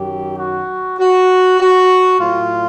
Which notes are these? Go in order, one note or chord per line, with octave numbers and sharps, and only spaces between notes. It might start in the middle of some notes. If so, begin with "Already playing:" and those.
Already playing: F#2 D#3 F#3 G4
F#4
F#4
F#4
A2 F#3 F4